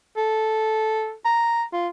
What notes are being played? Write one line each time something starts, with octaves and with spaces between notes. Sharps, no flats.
A4
A#5
F4